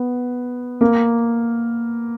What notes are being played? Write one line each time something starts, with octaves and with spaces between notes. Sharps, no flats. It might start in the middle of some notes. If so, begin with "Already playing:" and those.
Already playing: B3
A#3